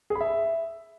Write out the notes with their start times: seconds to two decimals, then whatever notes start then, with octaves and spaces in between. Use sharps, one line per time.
0.10 G#4
0.15 B5
0.21 E5